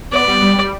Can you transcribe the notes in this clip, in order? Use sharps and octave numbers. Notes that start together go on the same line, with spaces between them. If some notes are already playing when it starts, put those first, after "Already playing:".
B3 D5
G3
G3
G3